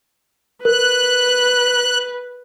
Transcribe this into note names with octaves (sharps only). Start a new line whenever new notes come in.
A#4 B4 F#6